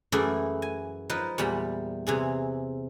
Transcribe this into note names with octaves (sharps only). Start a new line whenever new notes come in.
F#2 E3 A3 E4 G#4 D5
G#5
F3 D#4 A#4 B4
E2 A#2 G3 B5
C3 E3 G#4